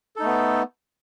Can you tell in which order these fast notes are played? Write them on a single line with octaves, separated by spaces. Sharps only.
A4 D#4 A3 B3